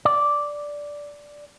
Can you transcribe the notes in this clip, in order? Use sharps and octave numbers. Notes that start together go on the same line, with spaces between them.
D5